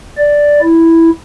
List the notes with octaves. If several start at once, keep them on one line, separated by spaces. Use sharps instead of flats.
D5
E4